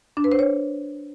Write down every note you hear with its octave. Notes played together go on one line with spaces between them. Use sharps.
D4
B4
C5
C#5